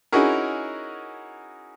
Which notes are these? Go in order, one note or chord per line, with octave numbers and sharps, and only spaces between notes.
C#4 D#4 E4 F#4 G#4 A#4